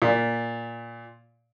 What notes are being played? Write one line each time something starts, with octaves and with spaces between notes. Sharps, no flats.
A#2